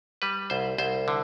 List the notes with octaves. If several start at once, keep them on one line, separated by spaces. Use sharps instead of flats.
G3 B4
C2 C5
C2 C5
D3